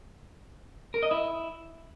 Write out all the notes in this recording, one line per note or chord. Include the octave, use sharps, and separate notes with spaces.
A#4
D#5
E4